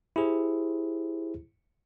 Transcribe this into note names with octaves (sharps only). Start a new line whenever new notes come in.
E4 G4 G#4 C5